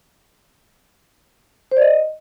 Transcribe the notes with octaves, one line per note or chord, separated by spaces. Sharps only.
C5
D5
D#5